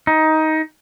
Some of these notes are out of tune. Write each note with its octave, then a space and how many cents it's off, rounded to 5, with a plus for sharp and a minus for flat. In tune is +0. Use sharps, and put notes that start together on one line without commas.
D#4 +15